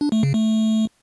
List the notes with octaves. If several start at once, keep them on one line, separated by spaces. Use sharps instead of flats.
D4
A3
C#3
A3